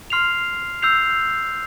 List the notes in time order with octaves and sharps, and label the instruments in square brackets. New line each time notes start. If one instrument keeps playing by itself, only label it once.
[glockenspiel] C6 F6 C7 F7
E6 G6 C7 F7